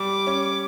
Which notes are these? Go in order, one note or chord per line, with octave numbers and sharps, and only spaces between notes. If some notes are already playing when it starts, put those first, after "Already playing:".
Already playing: G3 D6
C#4